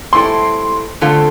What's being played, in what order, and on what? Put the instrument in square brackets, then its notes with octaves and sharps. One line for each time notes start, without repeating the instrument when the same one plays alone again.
[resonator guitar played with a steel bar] A2 G3 C4 E4 A4 [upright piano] C6
[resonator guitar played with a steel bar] D3 A3 C4 F4 A4